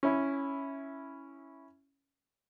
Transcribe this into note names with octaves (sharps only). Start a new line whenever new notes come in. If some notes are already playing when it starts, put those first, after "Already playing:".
C#4 E4